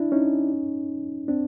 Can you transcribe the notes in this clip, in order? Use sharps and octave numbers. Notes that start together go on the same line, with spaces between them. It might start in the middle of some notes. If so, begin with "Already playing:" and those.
Already playing: D4 E4
C#4 D#4
C4 D4